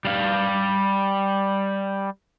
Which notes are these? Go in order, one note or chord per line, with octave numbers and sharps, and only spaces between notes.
G3 F5